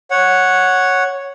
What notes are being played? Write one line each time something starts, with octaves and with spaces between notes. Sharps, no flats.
C#5 F#5